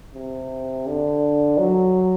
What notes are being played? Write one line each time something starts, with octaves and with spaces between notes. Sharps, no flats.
C3
D3
F#3